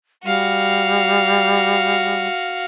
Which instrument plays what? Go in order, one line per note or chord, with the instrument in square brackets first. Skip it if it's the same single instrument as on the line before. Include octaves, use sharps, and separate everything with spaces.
[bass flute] G3 [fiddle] F#4 F5